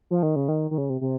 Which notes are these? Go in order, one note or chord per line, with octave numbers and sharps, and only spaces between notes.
F3
D#3
C#3
D#3
D#3
C#3
C3
C3